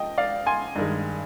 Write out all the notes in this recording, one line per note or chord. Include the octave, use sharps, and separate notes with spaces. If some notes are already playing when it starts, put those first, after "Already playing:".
Already playing: F3 D#5 G5
D5 F5
G#5 C6
G2 D#3 G#3